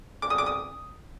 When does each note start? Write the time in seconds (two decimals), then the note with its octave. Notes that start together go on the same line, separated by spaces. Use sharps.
0.22 D6
0.30 D#6
0.38 D6
0.46 D#6